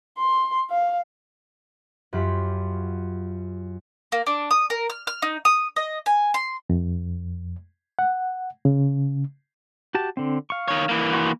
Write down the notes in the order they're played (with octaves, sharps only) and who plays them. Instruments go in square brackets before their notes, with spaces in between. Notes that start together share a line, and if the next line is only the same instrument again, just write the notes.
[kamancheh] C6
F5
[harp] F#2 F#3 F4 G4 B5
[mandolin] A#3
D4
D#6
A#4
F6
F6
D#4
D#6
D#5
G#5
C6
[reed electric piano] F2
F#5
C#3
[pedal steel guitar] F#4 G4 A5
D3 C4
F5 C#6
[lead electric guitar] D#3 C#5
E3 A#3
[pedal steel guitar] F#4 C6 C#6